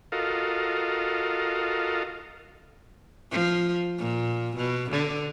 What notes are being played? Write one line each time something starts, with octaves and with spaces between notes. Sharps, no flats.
F4 F#4 A4 A#4 D#5 F5
F3
A#2
B2
D3